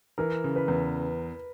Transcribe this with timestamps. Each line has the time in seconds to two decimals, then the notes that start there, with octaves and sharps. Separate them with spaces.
0.18 E3 A#4
0.44 C#3
0.56 B4
0.68 E2